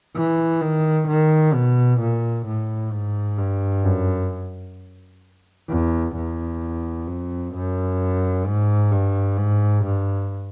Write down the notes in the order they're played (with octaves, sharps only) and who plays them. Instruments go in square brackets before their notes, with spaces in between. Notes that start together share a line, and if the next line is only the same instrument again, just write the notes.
[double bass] E3
D#3
D#3
B2
A#2
A2
G#2
G2
F#2
E2
E2
F2
F#2
G#2
G2
G#2
G2